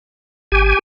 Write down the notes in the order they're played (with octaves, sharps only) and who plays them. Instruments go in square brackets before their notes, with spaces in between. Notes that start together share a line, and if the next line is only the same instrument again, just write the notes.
[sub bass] G#1 [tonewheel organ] G4 G#5